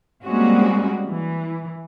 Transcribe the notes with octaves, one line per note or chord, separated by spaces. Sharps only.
G3 G#3 A#3 C4 C#4 F#4
E3